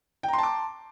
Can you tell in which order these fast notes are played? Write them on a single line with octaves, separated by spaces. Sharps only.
G5 A#5 C6 A5 D6